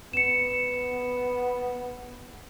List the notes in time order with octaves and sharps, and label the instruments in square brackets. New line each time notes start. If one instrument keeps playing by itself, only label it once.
[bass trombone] B3 [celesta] C#7 E7